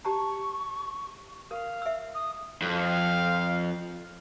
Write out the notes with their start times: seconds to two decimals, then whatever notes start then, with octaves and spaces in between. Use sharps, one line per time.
0.05 G4 A5 A#5 C#6
1.51 A#4 F5
1.82 E5 E6
2.15 D#6
2.62 F2 F5